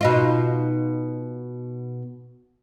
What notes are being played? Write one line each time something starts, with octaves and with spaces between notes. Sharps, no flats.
B2 D#4 F4